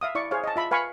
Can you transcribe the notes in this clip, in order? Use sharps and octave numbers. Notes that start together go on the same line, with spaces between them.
E5 F5 D#6
E4 D5 C#6
G#4 C5 C#5 F5
D#5 A5
F4 E5 B5
B4 F5 G#5 B5 C#6